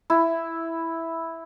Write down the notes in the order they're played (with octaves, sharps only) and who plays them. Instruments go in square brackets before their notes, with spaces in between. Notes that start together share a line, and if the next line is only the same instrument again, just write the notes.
[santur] E4